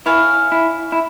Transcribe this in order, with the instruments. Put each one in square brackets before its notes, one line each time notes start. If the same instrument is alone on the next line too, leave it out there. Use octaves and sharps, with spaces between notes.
[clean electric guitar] E4 [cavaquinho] C#5 F5 G#5
[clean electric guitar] E4
E4